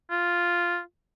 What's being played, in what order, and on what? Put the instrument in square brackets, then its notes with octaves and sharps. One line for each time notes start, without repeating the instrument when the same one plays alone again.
[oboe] F4